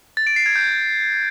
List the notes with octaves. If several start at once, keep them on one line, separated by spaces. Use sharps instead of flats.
A6
D7
C7
G#6
G6